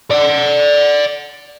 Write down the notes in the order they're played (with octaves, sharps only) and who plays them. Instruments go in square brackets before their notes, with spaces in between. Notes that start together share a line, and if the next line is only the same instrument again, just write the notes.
[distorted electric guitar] D5 F#5